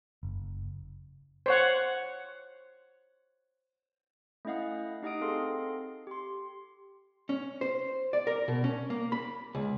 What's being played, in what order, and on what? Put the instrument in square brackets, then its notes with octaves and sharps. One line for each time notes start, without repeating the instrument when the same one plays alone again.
[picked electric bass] F#1
[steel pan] C5 C#5 F#5
[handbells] A3 C#4 E4 D#5 F5 F#5
D#4 G4 D#5 F#5 D#6 D7
C4 G#4 A4 F5 C6
G4 C6
[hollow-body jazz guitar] C#4
C5
D5
A#4
B2
C#4
A#3
B5
C#2